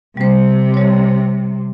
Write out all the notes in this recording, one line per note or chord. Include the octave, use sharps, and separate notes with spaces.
C3 G3 C5
G3 C#5